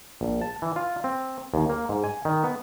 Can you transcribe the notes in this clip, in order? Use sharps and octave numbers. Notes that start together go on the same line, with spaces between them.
A#1
A5
E3
F4
C4
D#2
A#3
G#2
G#5
D#3
B3